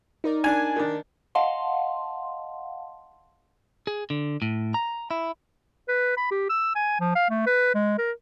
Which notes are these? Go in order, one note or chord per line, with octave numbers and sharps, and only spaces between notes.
D#4 A#4 D5
D4 G#5
D#3 D4
D#5 F5 F#5 A5 C6
G#4
D3
A2
A#5
E4
B4
B5
G4
E6
G#5
F3
F5
A3
B4
G#3
A#4